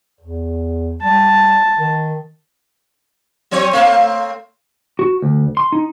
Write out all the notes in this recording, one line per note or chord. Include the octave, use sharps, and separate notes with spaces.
E2
G3 A5
D#3
F#3 C4 C#5
A3 A#3 C4
F#4
D2
C6
D#4